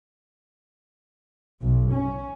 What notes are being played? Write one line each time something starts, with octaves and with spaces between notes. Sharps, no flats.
B1
C#4